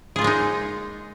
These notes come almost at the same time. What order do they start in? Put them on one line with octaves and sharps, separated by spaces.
G#4 F4 A#3 G#3 D#4